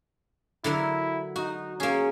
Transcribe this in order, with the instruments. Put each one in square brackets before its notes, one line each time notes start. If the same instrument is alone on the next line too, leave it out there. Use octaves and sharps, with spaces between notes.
[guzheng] D3 F#3 A#4 [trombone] E4
[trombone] D#4 [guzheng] F#4
[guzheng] A#3 G#4 [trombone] C#4